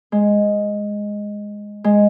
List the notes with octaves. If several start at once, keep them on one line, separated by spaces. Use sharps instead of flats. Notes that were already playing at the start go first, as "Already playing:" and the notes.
G#3
G#3